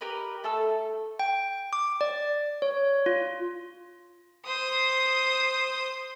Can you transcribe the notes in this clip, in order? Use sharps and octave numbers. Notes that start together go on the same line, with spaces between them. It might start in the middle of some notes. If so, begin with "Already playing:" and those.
G4 A#4 B4 D#5
A3 A4 A5 E6
G5
D6
D5
C#5
F4
C5 D#6